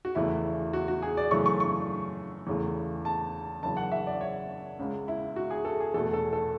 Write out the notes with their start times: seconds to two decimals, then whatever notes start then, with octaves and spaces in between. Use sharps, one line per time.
0.05 F#4
0.15 E2 C#3 E3 A3 E4
0.73 F#4
0.88 F#4
1.02 G#4
1.17 D5
1.31 F#2 C#3 E3 A3 C#6
1.46 C#6
1.60 C#6
2.47 E2 C#3 E3 A3
3.05 A5
3.63 F#1 F#2 C#3 E3 A5
3.77 F#5
3.92 E5
4.07 D5
4.21 C#5
4.79 C#2 C#3 G#3
5.08 E4
5.36 F#4
5.50 G#4
5.65 A4
5.80 G#4
5.94 E2 B2 A3 A4
6.13 A4
6.33 A4